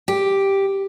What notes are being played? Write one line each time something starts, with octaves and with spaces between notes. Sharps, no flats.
G4